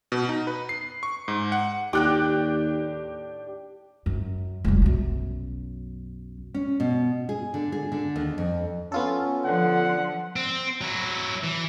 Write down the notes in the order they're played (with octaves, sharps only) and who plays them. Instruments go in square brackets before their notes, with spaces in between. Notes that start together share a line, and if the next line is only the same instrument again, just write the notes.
[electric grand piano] B2
D#4
B4
C7
C#6
G#2
F#5
[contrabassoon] D#2 [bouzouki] A2 C#3 D4 [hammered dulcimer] G4 [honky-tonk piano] G5 D6 F#6
[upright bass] F#2
F1 G3
B1 F#2
[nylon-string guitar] C#4
B2
G#4
D3
G#4
D3
D#2
F2
[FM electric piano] B3 F4 A4 [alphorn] C#4
[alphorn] D3 [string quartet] F3 [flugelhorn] F#5
[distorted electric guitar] C4
F#3 E4
E3